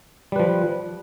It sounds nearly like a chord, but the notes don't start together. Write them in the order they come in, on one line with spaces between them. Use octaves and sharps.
G3 B4 F3